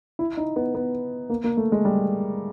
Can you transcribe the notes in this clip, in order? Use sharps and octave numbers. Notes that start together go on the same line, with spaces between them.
E4
D#4
B3
B3
A#3
A#3
A3
G#3
G3